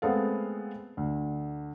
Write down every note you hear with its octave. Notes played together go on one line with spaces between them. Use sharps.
G#3 A3 B3 C4 A4 F5
D2